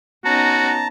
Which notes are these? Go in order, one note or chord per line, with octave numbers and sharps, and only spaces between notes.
B3 C#4 D#4 F#4 A5 A#5